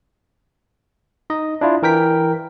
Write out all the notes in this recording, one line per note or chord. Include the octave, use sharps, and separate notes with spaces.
D#4 D#5
D4 E4 F4
E3 A#4 G5 B6